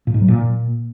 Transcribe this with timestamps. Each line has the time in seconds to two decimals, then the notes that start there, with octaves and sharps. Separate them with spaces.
0.07 A#2
0.14 G#2
0.21 F#3
0.28 A#2